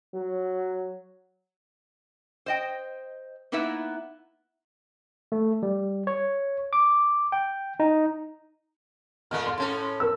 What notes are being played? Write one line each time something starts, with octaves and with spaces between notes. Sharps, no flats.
F#3
C5 D#5 G5
A#3 B3 D#4 E4 B4 E5
A3
G3
C#5
D6
G5
D#4
A#2 G#3 A3 F6
C6
A2 C#4 A4
A#4 E6